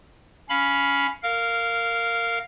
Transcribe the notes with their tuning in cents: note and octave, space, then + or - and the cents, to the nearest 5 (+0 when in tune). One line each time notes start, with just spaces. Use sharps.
C#4 +10 F5 +0 B5 +0
A#4 -15 F5 +0